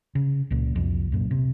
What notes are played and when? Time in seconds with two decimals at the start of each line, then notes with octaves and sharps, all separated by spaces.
0.15 C#3
0.51 C#2 A#2
0.76 C2 F2
1.12 F#2 A#2
1.31 C3